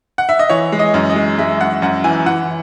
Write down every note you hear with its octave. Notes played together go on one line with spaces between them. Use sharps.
F#5
E5
D#5
E3 C#5
G#3
D#5
F#2
D#5
G#3
G#3 E5
F#2 F#5
F#2 F#5
E3 G#5
E3 F#5